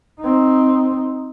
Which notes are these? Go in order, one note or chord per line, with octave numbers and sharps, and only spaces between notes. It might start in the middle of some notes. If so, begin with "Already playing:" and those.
C4 D#4